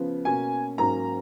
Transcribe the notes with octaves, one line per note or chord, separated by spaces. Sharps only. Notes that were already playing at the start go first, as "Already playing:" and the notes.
Already playing: C#3 F3 B3
B2 A#3 C#4 G#5
G#2 F#3 A#3 C#4 A#5